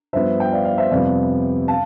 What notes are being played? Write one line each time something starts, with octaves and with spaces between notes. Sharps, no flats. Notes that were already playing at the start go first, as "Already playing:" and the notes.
G2 F3 B3 C5 E5
G5
D5 F5
D5 F5
C5 E5
F2 C3 G3 B3 D5 F5
F5 A5